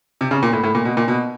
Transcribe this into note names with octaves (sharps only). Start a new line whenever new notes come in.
C3
C#3
A#2
A2
A2
A#2
B2
A#2
B2